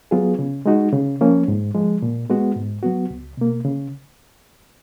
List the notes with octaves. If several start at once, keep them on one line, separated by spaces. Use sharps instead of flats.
F#3 B3 F4 G#4
C#3
G#3 D#4 F#4
C#3
F3 A#3 C#4
G#2
F3 G#3
A#2
G#3 B3 F#4
G#2
F#3 B3 F#4
C#2
B2 A#3
C#3